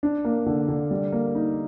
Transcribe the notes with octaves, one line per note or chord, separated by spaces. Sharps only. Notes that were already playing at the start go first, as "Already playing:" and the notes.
D4
A#3
D3
D3
G3
A#3
D#4